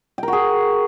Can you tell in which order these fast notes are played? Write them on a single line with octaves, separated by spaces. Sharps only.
G5 A#4 F#4 G#4